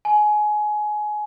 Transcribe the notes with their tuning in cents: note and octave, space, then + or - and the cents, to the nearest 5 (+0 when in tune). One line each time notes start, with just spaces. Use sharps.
G#5 +20